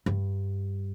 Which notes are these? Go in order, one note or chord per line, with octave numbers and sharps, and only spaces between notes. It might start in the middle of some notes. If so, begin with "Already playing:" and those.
G2